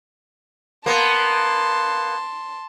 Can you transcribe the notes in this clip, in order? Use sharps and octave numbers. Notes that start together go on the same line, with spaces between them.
A#3 B3 A5 C6